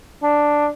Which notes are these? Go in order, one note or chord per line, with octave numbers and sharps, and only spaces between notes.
D4